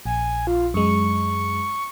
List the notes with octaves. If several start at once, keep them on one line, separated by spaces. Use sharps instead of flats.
A#1 G#5
F4
F#2 G#3 C#6